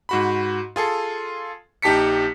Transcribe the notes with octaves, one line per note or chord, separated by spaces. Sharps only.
G#2 F#4 B5
F4 G#4 A4
A#1 D#4 G4 A5 B6 C#7